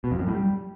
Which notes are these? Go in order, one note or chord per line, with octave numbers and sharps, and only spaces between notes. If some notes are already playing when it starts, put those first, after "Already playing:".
B2
F2
F#2
A2
G3